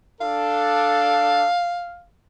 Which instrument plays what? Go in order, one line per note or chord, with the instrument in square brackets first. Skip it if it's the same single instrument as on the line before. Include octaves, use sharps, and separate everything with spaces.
[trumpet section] D4 A4 [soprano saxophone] F5